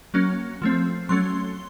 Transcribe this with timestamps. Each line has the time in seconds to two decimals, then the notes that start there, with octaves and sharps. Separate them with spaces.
0.14 F#3 A#3 C#4
0.62 F3 A3 C4
1.09 F#3 A3 C#4 C6